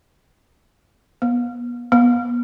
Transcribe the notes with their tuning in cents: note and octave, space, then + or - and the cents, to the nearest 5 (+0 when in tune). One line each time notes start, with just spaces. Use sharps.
B3 -30
B3 -30